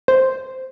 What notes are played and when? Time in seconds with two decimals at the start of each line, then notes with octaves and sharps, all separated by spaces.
0.08 C5